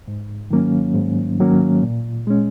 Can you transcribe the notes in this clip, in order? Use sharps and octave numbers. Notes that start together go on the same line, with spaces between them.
G#2
D#3 F#3 A#3 C#4
G#2
D#3 F#3 A#3 C#4
A#2
G#3 C#4